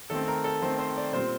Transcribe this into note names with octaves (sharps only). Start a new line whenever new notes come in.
D#3 A3 C4 A4
A#4
A4
D#3 A3 C4 C5
C5
D5
A#2 G3 C4 C5